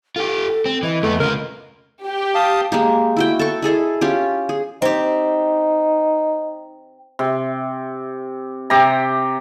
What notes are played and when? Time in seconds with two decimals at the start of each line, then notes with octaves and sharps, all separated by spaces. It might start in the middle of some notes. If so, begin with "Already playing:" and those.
0.16 F4 G4 A4
0.66 C4
0.83 E3 D#5
1.03 F2 A3 B3
1.20 C#3 F4 A#4
2.05 G4
2.35 F5 A5 D#6
2.72 G#3 A#3 G4
3.17 E4 F#4 G5
3.39 A4 C#6
3.62 E4 G#4 A4 D#5
4.01 C#4 F4 G4
4.49 G#4
4.82 C4 D#4 G4
7.19 C3
8.70 C3 G4 A#5